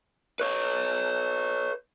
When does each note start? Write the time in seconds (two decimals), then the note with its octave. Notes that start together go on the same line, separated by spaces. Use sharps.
0.40 B4 C#5